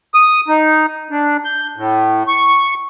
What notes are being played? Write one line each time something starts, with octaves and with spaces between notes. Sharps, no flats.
D#6
D#4
D4
G6
A2
C#6